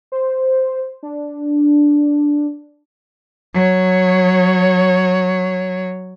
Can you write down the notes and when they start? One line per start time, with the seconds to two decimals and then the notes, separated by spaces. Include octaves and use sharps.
0.12 C5
1.03 D4
3.54 F#3 C#5